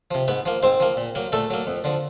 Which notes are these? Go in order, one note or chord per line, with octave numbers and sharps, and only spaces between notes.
C3 F3
G#2 B3 B4
F3 A#3
G#2 C4 C5
F3 A#3
A#2
F#3 A#3
A#2 A3 A4
F#3 A#3
F2
D3 F3